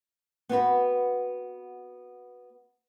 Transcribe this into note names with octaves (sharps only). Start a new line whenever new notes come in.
B3 C4 F#4 B4